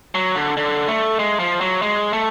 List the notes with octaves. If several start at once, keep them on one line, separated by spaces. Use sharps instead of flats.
F#3
D3
D3
A3
G#3
F3
F#3
G#3
A3